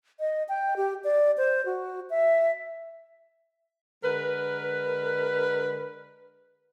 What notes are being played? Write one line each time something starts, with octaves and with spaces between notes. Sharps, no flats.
D#5
G5
G4
D5
C5
F#4
E5
D3 G#3 A#4 B4